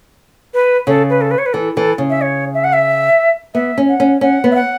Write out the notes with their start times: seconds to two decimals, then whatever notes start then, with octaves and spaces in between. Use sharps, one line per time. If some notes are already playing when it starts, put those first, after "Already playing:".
0.54 B4
0.87 C#3 A4
1.10 B4
1.21 A4
1.31 B4
1.38 C#5
1.46 B4
1.53 E3 A4
1.76 E3 A4
1.98 C#3
2.10 E5
2.21 C#5
2.54 E5
2.64 F#5
2.73 E5
3.54 B3 E5
3.78 C#4
3.89 F#5
4.00 C#4
4.21 C#4 F#5
4.44 B3
4.51 E5
4.55 F#5